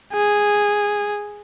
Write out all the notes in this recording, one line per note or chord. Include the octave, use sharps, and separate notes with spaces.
G#4